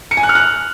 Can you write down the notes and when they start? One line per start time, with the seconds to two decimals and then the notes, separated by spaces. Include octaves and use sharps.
0.11 C#7
0.17 G#5
0.23 F#6
0.29 F6
0.35 F#6